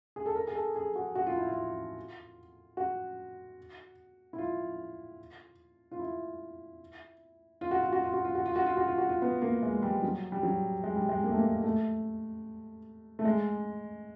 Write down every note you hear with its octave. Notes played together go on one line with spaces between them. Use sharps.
G#4
A4
A#4
G#4
A4
G#4
F#4
F#4
F4
E4
F4
F#4
E4
F4
F4
E4
F4
F#4
F4
F#4
F4
F#4
F4
F#4
F4
F#4
F4
F#4
F4
F#4
F4
B3
A#3
G#3
G3
F#3
G3
F#3
G#3
G3
G#3
A#3
A3
A#3
A3
A3
G#3